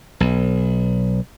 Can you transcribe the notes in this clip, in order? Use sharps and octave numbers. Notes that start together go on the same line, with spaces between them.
B1